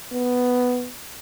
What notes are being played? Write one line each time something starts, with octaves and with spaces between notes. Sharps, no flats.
B3